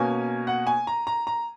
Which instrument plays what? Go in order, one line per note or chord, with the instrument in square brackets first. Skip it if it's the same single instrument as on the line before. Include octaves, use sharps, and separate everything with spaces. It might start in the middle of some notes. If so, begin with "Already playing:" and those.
Already playing: [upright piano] B2 A#3 C#4 G#5
F#5
G#5
A#5
A#5
A#5